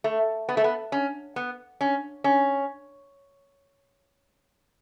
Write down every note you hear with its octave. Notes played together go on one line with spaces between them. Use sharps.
A3
B3
A3
B3
C#4
B3
C#4
C#4